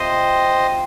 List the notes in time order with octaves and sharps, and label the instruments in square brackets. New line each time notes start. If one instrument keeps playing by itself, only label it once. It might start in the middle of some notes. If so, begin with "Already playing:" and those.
Already playing: [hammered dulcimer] C3 F3 C4 [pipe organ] C5 D#5